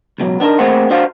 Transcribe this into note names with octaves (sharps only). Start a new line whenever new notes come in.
C#2 B2 D3 F#3
B3 D4 D#4 A#4
A3 A#3 C4 G#4 C5 F#5
D4 F#4 C5 F5